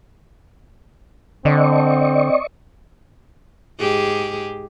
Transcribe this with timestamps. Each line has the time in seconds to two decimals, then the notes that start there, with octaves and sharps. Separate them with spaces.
1.45 D3 C4 D5 D#5 C#6
3.79 G#2 G4 G#4